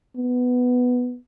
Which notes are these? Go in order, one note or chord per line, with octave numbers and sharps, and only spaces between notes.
B3